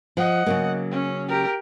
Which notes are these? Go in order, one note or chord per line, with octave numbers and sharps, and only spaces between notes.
F3 D#5 F#5
C#3 F#3 A#3
C#4
G4 A#4